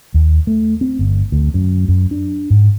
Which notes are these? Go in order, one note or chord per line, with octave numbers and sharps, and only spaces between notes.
D#2
A3
C4
G1
D2
F#2
F#2
D4
G#2